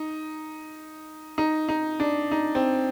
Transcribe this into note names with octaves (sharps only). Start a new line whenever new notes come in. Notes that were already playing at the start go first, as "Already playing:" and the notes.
Already playing: D#4
D#4
D#4
D4
D#4
C4